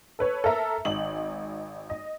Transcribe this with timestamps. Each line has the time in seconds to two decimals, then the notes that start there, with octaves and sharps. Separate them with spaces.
0.19 A4 B4 C#5
0.44 A4 A#4 E5 A#5
0.85 G#1 D#4 F#7
1.90 D#5